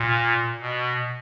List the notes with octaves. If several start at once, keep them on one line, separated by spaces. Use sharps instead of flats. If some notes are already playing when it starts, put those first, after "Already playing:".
Already playing: A#2
B2